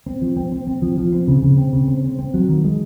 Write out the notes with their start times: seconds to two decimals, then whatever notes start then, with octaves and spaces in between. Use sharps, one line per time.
0.06 C4
0.22 F3
0.37 C4
0.52 C4
0.67 C4
0.82 F3
0.98 F3
1.12 C4
1.28 C#3
1.43 C#3
1.57 C4
1.73 C#3
1.88 C4
2.03 C4
2.19 C4
2.34 F#3
2.48 D#3
2.64 G#3